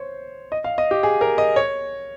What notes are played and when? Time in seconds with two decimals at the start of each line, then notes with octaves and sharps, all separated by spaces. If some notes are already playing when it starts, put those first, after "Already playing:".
Already playing: C5 C#5
0.52 D#5
0.64 F5
0.78 D#5
0.91 G4
1.03 G#4
1.21 A#4
1.38 D#5
1.56 C#5